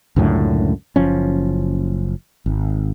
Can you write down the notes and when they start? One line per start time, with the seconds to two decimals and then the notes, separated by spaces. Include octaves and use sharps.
0.16 C#2 F#2 A2 D3
0.96 F#1 F3 C#4
2.46 G#1